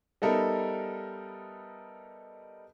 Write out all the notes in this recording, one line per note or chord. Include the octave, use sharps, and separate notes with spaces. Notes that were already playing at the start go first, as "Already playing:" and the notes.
G3 B3 D#4 A4 A#4 E5